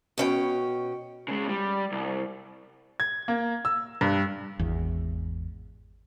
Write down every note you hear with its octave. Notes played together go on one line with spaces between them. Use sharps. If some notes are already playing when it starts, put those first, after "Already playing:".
B2 C#4 G5
C#3 G#3
G3
C2
G#6
A#3
E6
G2
G#1 E2